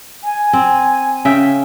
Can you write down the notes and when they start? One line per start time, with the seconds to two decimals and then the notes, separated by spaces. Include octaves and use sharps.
0.23 G#5
0.53 C4
1.25 C#3 E5 G5